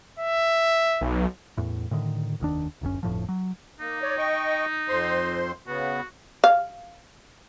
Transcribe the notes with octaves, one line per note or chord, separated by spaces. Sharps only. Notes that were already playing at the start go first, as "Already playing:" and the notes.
E5
B1
E2 A2
A2 D3 D#3
F1 D#2 D#3 D4
D1 G1 F#2 C#4
G1 F2 A2 F3
F#3
A#3 D#4
C#5 D5
D#5 G5 C#6
F2 C5 C6
C#3 B3 F#4
F5